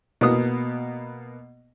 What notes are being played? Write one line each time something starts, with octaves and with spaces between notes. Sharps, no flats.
B2 A#3 B3 D#6